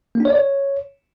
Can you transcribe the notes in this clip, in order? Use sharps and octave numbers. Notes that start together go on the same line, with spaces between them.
A#3
D4
C#5
D5
C#5